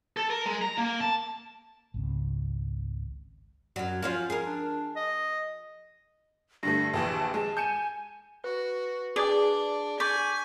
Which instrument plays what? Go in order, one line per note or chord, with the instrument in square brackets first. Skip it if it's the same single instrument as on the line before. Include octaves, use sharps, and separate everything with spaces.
[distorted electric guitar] A4
A#4
G#3
A#5
A#3
A5
[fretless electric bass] G#1 C#2 C4
[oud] F#2 F#3
F3 C#4 F4
G#4 A#4
[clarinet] D4
D#5
[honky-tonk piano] G2 D3 A3 [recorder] A#6
[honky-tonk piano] A#1 D#2 E3 [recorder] A5
[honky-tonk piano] G#3 [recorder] A5
[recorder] G#5 [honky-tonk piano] G6 C#7 E7
[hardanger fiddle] F#4 [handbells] B4
[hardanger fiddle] D4 [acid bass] G#4 [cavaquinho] D5
[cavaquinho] D5 [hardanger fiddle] G#5 [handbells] C#6 G6 B6